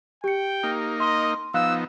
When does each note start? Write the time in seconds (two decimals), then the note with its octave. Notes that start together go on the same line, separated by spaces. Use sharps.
0.24 G4 G5 C#7
0.63 A#3 D#4
1.00 D#5 C6
1.54 F3 B3 D#4 F5 E6 F#6